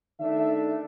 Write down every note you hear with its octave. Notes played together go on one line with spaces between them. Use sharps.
D#3 A3 D4 E5